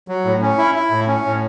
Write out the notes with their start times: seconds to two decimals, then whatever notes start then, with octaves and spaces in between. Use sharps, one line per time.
0.08 F#3
0.25 A2
0.41 C#4
0.58 E4
0.75 E4
0.91 A2
1.07 C#4
1.25 A2